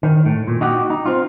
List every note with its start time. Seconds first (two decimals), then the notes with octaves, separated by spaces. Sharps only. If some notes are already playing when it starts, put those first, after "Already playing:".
0.03 D#3
0.25 A2
0.47 A#2
0.61 D#4 F#4 G4
0.90 D#4
1.06 C4 F4